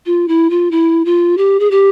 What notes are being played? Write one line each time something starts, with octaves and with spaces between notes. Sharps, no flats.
F4
E4
F4
E4
F4
G4
G#4
G4